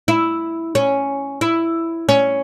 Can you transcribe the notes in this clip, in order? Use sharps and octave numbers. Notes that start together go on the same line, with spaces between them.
E4
C#4
E4
C#4